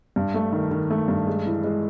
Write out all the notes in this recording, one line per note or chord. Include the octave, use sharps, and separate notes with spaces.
G2
A3
D#3
D#3
A3
G2
G#3
E3
G#3